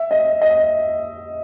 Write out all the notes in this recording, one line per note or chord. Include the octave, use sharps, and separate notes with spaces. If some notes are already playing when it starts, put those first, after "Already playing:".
Already playing: E5
D#5
D#5